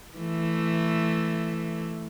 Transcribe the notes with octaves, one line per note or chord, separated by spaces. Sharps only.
E3 A3